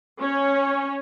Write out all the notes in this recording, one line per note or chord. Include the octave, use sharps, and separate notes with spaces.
C#4 C#5